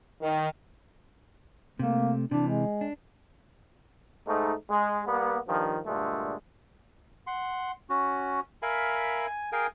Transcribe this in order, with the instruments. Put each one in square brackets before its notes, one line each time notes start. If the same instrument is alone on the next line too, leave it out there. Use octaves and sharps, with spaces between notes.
[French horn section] D#3
[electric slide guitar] C3 A3 [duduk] A#3
[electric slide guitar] C3 E3 [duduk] D4
[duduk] G#3
[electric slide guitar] D4
[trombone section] G#2 A3 D#4
G#3
G3 A#3 B3
G2 D#3 F3
G2 A#2 D3 G#3 A3
[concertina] F#5 C6
C#4 F#4
A#4 E5 F5 G#5 B5
G#5
G#4 A#4 F5 G5 G#5